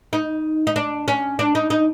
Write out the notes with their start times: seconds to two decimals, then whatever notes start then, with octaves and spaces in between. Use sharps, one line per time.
0.13 D#4
0.67 D#4
0.76 D4
1.08 C#4
1.39 D4
1.55 D#4
1.70 D#4